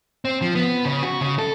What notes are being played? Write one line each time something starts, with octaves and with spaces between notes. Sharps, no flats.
C4
F3
B3
C#3
F#4
C#3
A4